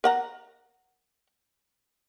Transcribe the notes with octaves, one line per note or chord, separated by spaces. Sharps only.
A#4 F#5 A#5